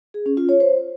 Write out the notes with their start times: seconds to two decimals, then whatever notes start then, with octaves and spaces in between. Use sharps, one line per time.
0.14 G#4
0.26 C#4
0.37 F4
0.49 C#5
0.60 C5